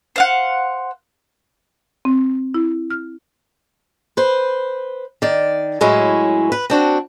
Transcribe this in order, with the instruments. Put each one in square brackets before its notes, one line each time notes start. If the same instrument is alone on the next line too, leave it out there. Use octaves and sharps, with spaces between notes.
[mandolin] C5 F5 F#5
[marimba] C4
E4
F6
[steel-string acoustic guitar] B4 C5
D#3 D5
A2 F#3 G#3 C#4 E4
B4
C4 D4 F#4